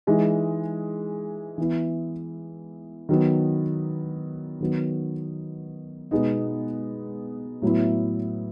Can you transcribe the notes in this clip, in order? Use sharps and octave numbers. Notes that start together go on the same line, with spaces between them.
E3 G#3 D#4
E3 B3 E4
D#3 F#3 B3
D#3 F#3 B3
B2 G#3 B3 D#4
A2 F#3 B3 E4